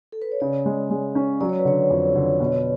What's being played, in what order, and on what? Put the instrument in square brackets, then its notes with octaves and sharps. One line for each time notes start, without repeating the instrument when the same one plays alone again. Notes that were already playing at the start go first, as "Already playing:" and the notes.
[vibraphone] A4
B4
C#5
[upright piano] C#3 [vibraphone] D5
[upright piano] G#3
G#3
C#4
[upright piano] F#3 [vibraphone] D5
[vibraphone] C#5
B4
[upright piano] D3 [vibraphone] C#5
[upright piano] F2
D3
B2